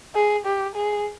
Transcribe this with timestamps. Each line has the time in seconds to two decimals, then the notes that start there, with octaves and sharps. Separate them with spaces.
0.15 G#4
0.45 G4
0.75 G#4